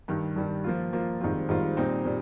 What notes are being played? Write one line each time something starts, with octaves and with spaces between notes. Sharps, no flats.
G2 D#3 G3
G2 D#3 G3
F3 A#3 F4
F3 A#3 F4
G#2 D#3 G3 C4 F4
G#2 D#3 G3 C4 F4
A#2 G3 C4 D#4
A#2 G3